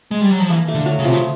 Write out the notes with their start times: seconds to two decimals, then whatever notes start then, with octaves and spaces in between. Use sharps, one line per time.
0.11 G#3
0.21 G3
0.31 F#3
0.40 F3
0.49 E3 A#3
0.68 A3
0.75 D3
0.86 F#3
0.99 C#3
1.04 C3 F3
1.13 C#3